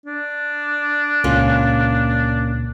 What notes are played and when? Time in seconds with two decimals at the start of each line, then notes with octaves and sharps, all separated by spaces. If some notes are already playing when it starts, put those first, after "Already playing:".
0.06 D4
1.24 C#2 A#2 A#3 C#4 F4